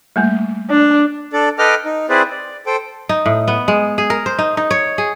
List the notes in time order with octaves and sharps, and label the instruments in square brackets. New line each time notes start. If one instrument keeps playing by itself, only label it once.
[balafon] G3 A3 A#3
[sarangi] D4
[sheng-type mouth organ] D4 A4 D5
A4 B4 D#5 G5 D6 F6
D#4
C4 E4 G#4 B4 C5 D5
D5
A4 C5 G5
[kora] D#4
A2
B3
G#3
G#4
A#4
C5
D#4
D#4
C#5
G#4